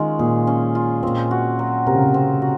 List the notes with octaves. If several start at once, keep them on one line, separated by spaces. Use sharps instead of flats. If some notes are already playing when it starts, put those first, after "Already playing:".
Already playing: D#3 G#3 C#4 F4
A#2 G#4
C#4
F4
A#2 C4
F#4
F#3
C3 A#4
C#3
C3
C4
F#4